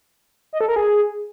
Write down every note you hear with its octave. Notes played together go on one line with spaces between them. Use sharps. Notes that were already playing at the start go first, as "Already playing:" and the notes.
D#5
A4
A#4
G#4